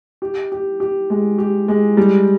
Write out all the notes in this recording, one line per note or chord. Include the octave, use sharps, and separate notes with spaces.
G4
G4
G4
G#3
G4
G#3
G3